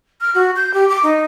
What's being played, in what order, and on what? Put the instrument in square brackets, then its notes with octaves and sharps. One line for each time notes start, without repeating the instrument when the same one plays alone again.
[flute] F6
F#4
G6
G4
D6
D#4